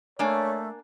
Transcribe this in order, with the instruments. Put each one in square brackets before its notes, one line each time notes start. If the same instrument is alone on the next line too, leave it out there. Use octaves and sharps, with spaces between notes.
[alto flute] A3 [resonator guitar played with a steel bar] A#3 D4 G#5 [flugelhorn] C#5